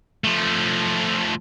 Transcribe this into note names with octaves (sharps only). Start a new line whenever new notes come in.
F3 A3